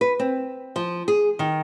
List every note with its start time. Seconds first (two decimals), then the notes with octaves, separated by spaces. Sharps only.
0.01 B4
0.19 C4
0.76 F3
1.08 G#4
1.39 D#3